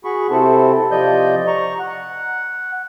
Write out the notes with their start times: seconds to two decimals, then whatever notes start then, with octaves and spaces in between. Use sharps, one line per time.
0.05 F#4 G#4 B5 C#6
0.30 C3 C4 E4 A4
0.91 C3 F3 D5 D#5 G6
1.47 A#5 C#6
1.79 F#5